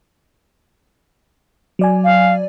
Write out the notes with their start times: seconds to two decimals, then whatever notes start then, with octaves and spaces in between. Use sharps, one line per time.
1.79 F#3 D5 G#5
2.04 F5